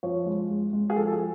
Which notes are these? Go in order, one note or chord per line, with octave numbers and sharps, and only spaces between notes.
F3 C#5
G#3
G#3
G#3
G#4
F3 A4
A4
G#4